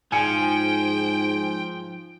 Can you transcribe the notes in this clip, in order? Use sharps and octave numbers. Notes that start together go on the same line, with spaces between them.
G#2 F3 G5 G#5 C#7